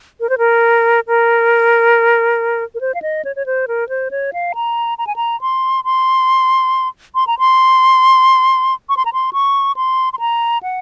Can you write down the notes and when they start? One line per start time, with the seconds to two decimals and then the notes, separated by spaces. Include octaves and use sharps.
0.20 A#4
0.29 C5
0.38 A#4
1.08 A#4
2.75 A#4
2.81 C5
2.94 F5
3.02 D#5
3.25 C#5
3.36 C#5
3.46 C5
3.68 A#4
3.89 C5
4.11 C#5
4.33 F5
4.55 A#5
4.98 A#5
5.07 G#5
5.16 A#5
5.41 C6
5.84 C6
7.15 C6
7.27 A#5
7.39 C6
8.89 C#6
8.97 C6
9.05 A#5
9.13 C6
9.33 C#6
9.76 C6
10.13 C6
10.19 A#5
10.63 F#5